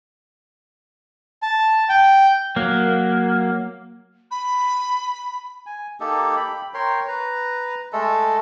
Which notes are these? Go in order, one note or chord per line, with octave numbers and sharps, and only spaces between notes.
A5
G5
F#3 A#3
B5
G#5
A#3 D#4 G4 A4
G5 B5
A#4 C#5 G5 C6
B4 A#5
G#3 A3 A4